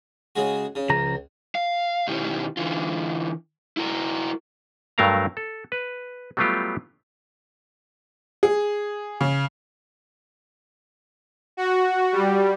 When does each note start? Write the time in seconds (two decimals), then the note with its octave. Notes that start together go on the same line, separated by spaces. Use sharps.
0.36 C#3 G#3 F#4
0.75 C#3
0.89 C#2 C#3 F3 A#5
1.55 F5
2.08 B2 D#3 C#4 E4 G4
2.57 D3 E3 F4
3.77 E4 F#4 A#4
4.98 G2 F#3 A3 A#4 F5 A#5
5.37 A4
5.72 B4
6.37 F#3 G3 A3 B3 F4 G4
8.43 G#4
9.21 C#3
11.57 F#4
12.12 G3